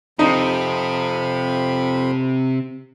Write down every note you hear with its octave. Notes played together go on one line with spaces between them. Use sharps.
F2 C3 F3 D#4 B5